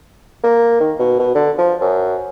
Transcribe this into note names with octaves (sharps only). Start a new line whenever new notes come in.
A#3
D#3
B2
B2
D3
F3
F#2